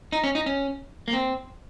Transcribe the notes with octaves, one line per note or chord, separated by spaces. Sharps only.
D#4
C#4
D#4
C#4
A#3
C4